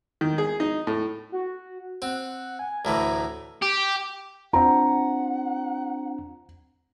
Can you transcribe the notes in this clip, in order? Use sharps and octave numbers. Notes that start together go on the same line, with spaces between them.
D#3
G#4
D#4
A2
F#4
C4 F#5
G#5
D2 A2 E3 A#5
G4
C4 D4 F4 F#5 A#5